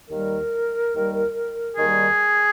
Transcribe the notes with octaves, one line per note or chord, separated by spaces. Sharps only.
D#2 D#3 G3 A#4
D#2 D#3 G3
D#2 D#3 G3 G#4